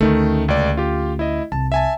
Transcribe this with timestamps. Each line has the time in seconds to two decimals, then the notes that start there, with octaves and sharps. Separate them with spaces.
0.01 D2 D#3 A3 C#4
0.48 C#2 D5
0.77 F4 G4
1.19 E4 D#5
1.52 C2 A5
1.72 E5 G#5 A5